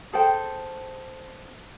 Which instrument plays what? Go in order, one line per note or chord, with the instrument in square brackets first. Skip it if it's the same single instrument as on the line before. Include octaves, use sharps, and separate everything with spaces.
[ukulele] G#4 A4 C5 G5